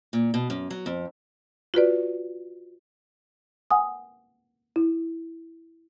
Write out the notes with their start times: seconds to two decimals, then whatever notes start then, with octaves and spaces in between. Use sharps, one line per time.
0.13 A#2
0.34 B2
0.50 F#2
0.71 F#3
0.86 F2
1.74 F4 F#4 B4 D5
3.71 F#5 G#5 D#6
4.76 E4